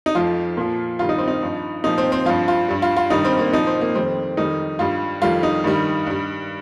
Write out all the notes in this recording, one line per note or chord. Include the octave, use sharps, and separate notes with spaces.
D#4
F2 F3 F4
A#2 F3
G2 D#3 G3 F4
D#4
C4
D#4
G2 F3
A#2 F3 D#4
C4
C4
G2 F3 F4
F4
G2 G3
F4
F4
G2 D#3 G3 D#4
C4
A#3
A#2 F3 D#4
C4
A#3
F2 D#3 G3 C4
F2 D#3 G3 D#4
G2 G3 F4
F2 D#3 G3 F4
D#4
G2 D#3 G3
G2 G3